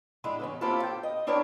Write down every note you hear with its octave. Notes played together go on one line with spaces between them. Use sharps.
D3 G#3 E4
E2 C#3 C#4
A#3 C4 E4 F4 G4 A4
G5
D#5
C4 D4 E4 A#4 C#5 D5